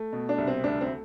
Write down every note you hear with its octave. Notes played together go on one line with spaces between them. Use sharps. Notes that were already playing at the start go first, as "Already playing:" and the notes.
Already playing: A3
B2
D4
C2
C4
D2 D4
C4
A3